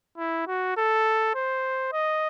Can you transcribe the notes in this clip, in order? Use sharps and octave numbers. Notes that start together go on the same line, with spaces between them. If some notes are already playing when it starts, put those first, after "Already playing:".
E4
F#4
A4
C5
D#5